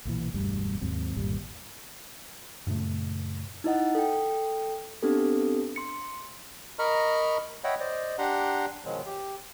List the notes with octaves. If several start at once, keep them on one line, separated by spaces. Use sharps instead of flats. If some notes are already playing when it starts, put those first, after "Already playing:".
B1 A#2 E3
E1 D2 G2 G3
D#2 G#2 F#3 C4
G1 D#2 A#2 G3
F#2 A#2 C#3 A3
D#4 E4 D#5 F#5
A4 G5
B3 C4 D4 G4 A4
C6 C#7
A#4 D#5 A#5 B5 C#6 F6
C#5 D#5 E5 F#5 G5 B5
C5 D5 D#5
D4 G4 F#5 A#5 C6
B2 D#3 F3 F#3 G#3
G4